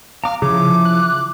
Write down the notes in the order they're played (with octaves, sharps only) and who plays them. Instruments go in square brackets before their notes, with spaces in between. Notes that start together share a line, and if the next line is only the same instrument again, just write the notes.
[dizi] F5 [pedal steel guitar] A#5 D6
[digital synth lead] C#3 [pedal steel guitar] F3 E4 [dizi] D6
[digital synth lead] F#6